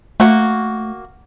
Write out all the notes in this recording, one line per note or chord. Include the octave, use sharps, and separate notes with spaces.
A3 A#3 F#4